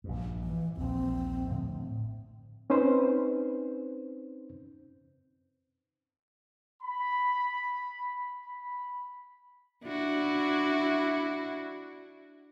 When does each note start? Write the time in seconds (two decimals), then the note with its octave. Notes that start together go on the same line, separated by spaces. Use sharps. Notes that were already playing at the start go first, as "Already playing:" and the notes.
0.04 A#1 G2
0.44 E3
0.77 A#1 D#2 C4
1.49 A2 D3 F3
2.70 C4 C#4 D#4 B4 C5
6.82 B5
8.45 B5
9.85 D4 E4 F#4